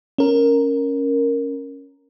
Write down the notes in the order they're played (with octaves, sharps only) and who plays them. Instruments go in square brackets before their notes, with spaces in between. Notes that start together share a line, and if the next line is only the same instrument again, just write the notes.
[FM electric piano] C#4 A#4